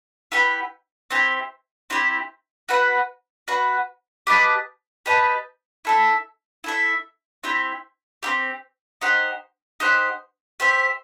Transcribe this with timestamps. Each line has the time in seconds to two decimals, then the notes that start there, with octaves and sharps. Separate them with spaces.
0.32 E4 G4 B4 F#5
1.10 C4 E4 G4
1.90 C4 E4 G4
2.69 F#4 B4 F#5
3.48 F#4 B4 F#5
4.27 G4 B4 D#5 A5
5.06 G4 B4 D#5 A5
5.85 E4 A4 E5
6.64 E4 A4 E5
7.44 C4 E4 G4
8.23 C4 E4 G4
9.01 D#4 G4 C5 F#5
9.80 D#4 G4 C5 F#5
10.60 G4 C5 E5